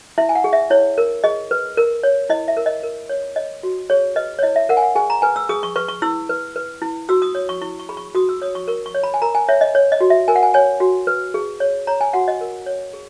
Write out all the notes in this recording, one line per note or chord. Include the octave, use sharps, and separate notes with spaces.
E4 E5
G#5
F#5
G#4
E5
E4 C#5
A#4
G#4 D#5
B4
A#4
C#5
E4 D#5
E5
A#4
D#5
A#4
C#5
C#5 D#5
F#4
G#4 C#5
B4 D#5
C#5
E4 D#5
E5
A#4 F#5
G#5
F#5
G#4 G#5
A#5
B4 G#5
E6
G#4 D#6
C#6
B4 C#6
C#6
E4 E6
B4
B4
E4
F#4 E6
D#6
C#5 D#6
C#6
E4 C#6
C#6
G#4 B5
C#6
F#4 D#6
E6
C#5 D#6
C#6
A#4 C#6
C#6
C#5
B5
G#5
A#4 A#5
G#5
C#5 E5
D#5
C#5
D#5
F#4
E5
A#4 G#5
F#5
G#5
C#5 G#5
F#4
B4
G#4
C#5
C#5 A#5
G#5
F#4 F#5
D#5
A#4
C#5
G#4